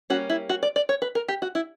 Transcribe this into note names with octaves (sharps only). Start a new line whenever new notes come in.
G3 A#3 C#4 F#4
E4
F#4
D5
D5
C#5
B4
A#4
G4
F#4
E4